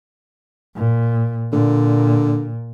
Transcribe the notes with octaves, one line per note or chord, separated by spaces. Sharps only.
A#2
A#2 D3